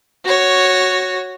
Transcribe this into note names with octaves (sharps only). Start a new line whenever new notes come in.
F#4 C#5